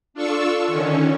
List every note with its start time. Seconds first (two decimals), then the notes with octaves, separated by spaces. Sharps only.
0.14 D4 F4 A4 C#6 E6
0.67 D3 D#3 C#4